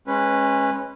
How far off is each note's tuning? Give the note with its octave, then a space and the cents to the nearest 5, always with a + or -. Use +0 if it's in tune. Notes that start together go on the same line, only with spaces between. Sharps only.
G#3 +0 C#4 -20 B4 +0